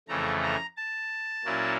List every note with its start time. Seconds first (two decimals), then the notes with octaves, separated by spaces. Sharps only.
0.08 F2 C#3 E3 A3 A#5
0.42 A#5
0.77 A5
1.45 A#2 F#3 A#3 C#4 E4